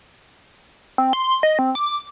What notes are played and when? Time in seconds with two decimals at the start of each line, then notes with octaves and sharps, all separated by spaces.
0.98 C4
1.13 C6
1.43 D#5
1.59 C4
1.75 D6